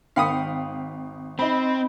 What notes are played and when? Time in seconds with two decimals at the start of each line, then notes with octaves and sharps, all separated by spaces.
0.16 G#1 F5 G5 B5 D#6 C#7
1.39 C4 D#4 B5